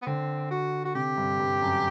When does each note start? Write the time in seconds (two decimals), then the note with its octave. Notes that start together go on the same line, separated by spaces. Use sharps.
0.02 B3
0.06 D3 C4
0.51 F#4
0.85 F#4
0.95 C3 G4
1.17 G2
1.40 G2
1.62 F#2